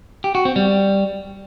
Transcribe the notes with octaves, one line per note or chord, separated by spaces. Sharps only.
G4
F#4
C4
G3